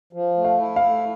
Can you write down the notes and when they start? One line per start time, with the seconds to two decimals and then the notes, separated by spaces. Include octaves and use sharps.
0.13 F3
0.37 A3
0.45 F5
0.60 E4
0.76 F5
0.84 A3